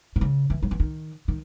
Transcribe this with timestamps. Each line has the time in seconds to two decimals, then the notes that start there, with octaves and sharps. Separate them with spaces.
0.16 B2
0.21 C#3
0.50 E3
0.63 F#3
0.71 E3
0.80 D#3
1.28 D#3